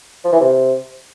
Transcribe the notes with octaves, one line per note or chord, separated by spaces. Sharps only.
F3
E3
C3